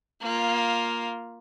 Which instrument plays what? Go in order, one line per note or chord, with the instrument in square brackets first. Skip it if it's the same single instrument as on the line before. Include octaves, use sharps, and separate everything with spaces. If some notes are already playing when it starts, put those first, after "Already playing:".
[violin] A#3 F4